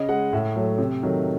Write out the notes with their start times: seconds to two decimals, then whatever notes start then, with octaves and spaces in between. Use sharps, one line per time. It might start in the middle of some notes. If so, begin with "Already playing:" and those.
Already playing: C#3 D#5
0.09 G#3 F#5
0.33 A2 E5
0.56 F#3 A3
0.78 C3
1.03 D#3 F#3 A3